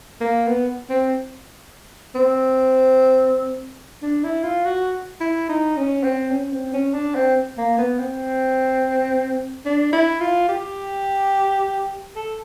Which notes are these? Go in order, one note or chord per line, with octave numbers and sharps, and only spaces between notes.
A#3
B3
C4
C4
D4
E4
F4
F#4
E4
D#4
C#4
C4
C#4
C4
C#4
D4
C4
A#3
B3
C4
D4
E4
F4
G4
A4